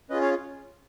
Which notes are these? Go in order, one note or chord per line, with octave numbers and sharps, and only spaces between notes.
C#4 F4 G#4 B4 D#5
C#5 F5